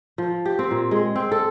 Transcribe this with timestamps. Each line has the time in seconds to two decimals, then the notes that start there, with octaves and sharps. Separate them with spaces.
0.18 F3
0.46 G4
0.59 C4
0.71 A#2
0.91 G#3
1.16 C4
1.32 A4